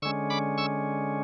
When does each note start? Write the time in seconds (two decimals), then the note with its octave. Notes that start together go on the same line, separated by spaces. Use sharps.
0.02 D3 G#3 C#4 C#6 E6
0.30 B5 D6
0.58 C#6 E6